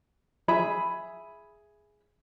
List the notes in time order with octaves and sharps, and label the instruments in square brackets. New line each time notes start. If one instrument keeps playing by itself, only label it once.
[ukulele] G#4 E5 B5